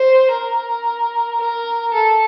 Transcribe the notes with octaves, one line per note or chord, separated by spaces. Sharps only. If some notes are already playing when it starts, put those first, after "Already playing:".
Already playing: C5
A#4
A#4
A4